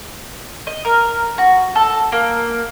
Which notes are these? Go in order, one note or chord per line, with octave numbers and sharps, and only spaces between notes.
D#5
A#4
F#4
A4
A#3